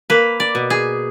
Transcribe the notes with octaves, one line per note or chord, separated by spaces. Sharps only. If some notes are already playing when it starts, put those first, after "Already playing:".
A#3 B4
D5
B2
G#4